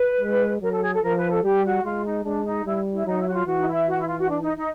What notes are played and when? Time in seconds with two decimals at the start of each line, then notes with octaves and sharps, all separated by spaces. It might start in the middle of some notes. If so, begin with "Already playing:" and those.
Already playing: B4
0.21 G#3
0.61 F#3 A#4
0.71 A4
0.82 G#4
0.92 A4
1.02 F3 A#4
1.16 B4
1.29 A4
1.43 G3 G4
1.63 F#4
1.83 G#3 F4
2.04 D#4
2.24 G#3 D4
2.45 D#4
2.65 G3 E4
2.92 E4
3.05 F#3 D#4
3.19 E4
3.27 F#4
3.33 F4
3.46 E3 F#4
3.58 D#4
3.66 E4
3.87 F#4
3.97 E4
4.07 F4
4.18 F#4
4.28 D4
4.41 D#4
4.54 D#4